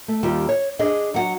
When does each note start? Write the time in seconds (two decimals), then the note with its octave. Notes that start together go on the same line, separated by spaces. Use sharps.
0.08 A3
0.23 D#2 D#3 G3 F4
0.49 C#5
0.79 D4 G#4 D#5
1.14 F#3 F#5